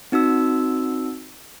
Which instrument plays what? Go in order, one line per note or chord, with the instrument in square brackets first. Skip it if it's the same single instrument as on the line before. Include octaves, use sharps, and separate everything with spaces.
[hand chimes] C4 D#4 F#4 E6